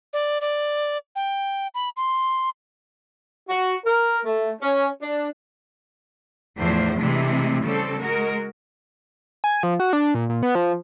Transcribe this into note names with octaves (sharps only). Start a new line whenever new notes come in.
D5
D5
G5
B5
C6
F#4
A#4
A3
C#4
D4
E2 A2 F3 D4 C5
C3 E3 G#3 A3 D4
C#3 G3 C4 A4
G#3 F#4 A#4
G#5
F3
F#4
D4
A#2
A#2
B3
F3